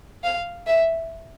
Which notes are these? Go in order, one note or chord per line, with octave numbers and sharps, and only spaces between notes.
F5
E5